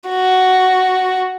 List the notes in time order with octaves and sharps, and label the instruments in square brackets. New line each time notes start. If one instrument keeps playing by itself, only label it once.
[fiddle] F#4